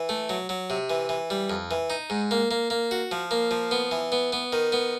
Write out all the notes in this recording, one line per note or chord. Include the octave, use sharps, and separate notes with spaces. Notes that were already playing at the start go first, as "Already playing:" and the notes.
Already playing: E3
A3
F#3
F#3
C3
E3
E3
G3
F2
E3
D#4
G#2
A#3
A#3
A#3
F#4
F3
A#3
F3
B3
E3
B3
B3
D#3
B3